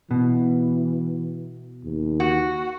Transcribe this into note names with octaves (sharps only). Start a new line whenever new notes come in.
B2 E3
D#2
F#4